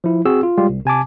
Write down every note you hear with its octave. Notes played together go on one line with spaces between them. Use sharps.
F3 E4
C4 F#4 G#4 E6
F4
G3 G#3 F4 G4
C2
C3 G#5 A5 D6